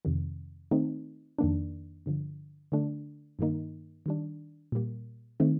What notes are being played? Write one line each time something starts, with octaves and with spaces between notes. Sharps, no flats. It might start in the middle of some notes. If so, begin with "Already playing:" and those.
F2 C3 D#3
D#3 A3 C4 D#4
F2 D#3 A#3 D4
G2 D3 F3
D3 A3 D4
G2 D#3 A#3 D#4
D#3 G3 D4
A#2 G3 A#3
D#3 A3 C4 D#4